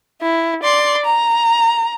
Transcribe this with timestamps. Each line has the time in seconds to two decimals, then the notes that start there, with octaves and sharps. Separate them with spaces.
0.22 E4
0.63 D5 C6
1.05 A#5